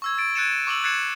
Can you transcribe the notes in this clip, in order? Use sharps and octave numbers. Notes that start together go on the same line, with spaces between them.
C#6 E6 G#6
A6 D7
F#6 G#6 A6 C#7 D#7 E7
C#6 D6 E6 F#7
F#6 G#6 A6 C7 C#7 E7